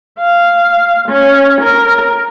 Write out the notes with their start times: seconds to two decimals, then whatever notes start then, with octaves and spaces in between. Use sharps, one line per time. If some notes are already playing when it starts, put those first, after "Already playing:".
0.19 F5
1.09 C#4
1.61 A#4